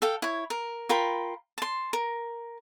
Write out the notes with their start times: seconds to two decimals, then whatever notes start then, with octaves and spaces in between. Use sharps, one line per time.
0.02 A4 F5 G5
0.22 E4 C#5
0.50 A#4
0.89 F4 A#4 G5 B5
1.58 A5 C6
1.93 A#4